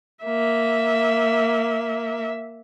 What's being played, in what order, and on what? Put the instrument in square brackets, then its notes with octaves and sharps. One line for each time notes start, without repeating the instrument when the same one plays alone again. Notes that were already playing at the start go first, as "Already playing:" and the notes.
[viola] A#3 E5